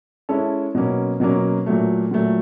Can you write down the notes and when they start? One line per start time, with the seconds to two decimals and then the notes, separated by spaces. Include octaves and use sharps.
0.29 G#3 C#4 E4 A4
0.75 B2 F#3 A#3 C#4
1.20 B2 F#3 A#3 C#4
1.66 A#2 F#3 A3
2.11 A#2 F#3 A3